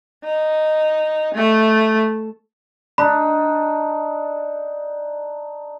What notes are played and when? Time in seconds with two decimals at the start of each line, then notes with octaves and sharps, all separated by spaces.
0.24 D#4
1.35 A3
2.98 D4 D#4 B5